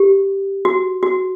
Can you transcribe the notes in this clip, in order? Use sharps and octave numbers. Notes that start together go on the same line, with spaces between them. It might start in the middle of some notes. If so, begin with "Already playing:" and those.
Already playing: G4
F#4
F#4